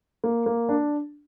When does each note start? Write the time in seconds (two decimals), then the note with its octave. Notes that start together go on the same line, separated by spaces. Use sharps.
0.24 A#3
0.46 A#3
0.69 D4